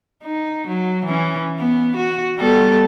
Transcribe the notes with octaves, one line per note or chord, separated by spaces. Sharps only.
D#4
F#3
E3 C#4
B3
F#4
G3 B3 A4